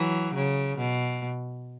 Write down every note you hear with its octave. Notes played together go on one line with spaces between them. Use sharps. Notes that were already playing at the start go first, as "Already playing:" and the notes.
Already playing: E3 F#3
C#3
B2